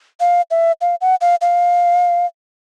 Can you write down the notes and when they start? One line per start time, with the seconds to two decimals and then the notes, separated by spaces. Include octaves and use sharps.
0.20 F5
0.51 E5
0.81 F5
1.01 F#5
1.21 F5
1.41 F5